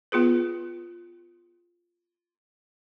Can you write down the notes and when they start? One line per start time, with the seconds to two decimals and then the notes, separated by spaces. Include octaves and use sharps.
0.12 B3 F4 G#4 B4